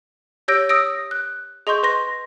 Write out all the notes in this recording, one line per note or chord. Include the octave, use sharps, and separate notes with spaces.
G4 C#5 E6 G6 A#6 D7
D#6 E6 A#6 D7
F#6
G#4 D#5 C6 C#6 G6
B4 C6 A#6